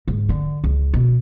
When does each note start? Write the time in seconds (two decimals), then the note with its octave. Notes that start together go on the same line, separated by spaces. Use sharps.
0.08 G#2
0.29 D3
0.64 C#2
0.94 B2